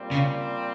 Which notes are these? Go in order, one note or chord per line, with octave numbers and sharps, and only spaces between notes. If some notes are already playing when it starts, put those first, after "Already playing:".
Already playing: A#2 G3 C4
C#3